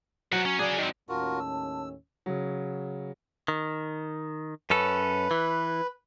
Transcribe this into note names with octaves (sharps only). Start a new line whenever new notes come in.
F#3 C5 F#5
C#4
C#3 D4 G#4
D#3 C4
D#2 A2 C#4 F4 F#4 A#4 A5
E6
C#3 F#3
D#3
F#2 C#4 A4 B4
E3